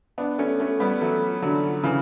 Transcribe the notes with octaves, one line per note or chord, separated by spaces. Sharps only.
B3 D4
A3 C#4
A3 C#4
G3 B3
F#3 A3
D3 F#3
C#3 E3